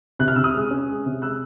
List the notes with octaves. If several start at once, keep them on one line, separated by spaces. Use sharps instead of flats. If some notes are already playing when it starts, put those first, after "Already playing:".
C3 F#6
F6
C3 E6
D#6 F6
G#3
C#4
G#3
C3
G#3 E6 F#6